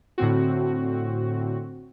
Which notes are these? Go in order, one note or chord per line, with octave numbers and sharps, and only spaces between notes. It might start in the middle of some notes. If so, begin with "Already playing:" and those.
A2 D3 C4 F#4